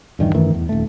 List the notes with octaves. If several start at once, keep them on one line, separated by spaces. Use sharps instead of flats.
E1 G2 D#3 E3
F#2 D#3 E3 A3
E2
D#1 A3